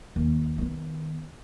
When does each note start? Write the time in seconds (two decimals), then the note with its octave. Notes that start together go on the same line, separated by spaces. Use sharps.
0.16 D#2
0.58 D#3 B3